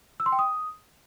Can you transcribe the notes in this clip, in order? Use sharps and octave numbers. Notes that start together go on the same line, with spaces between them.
E6
C6
G5
D#6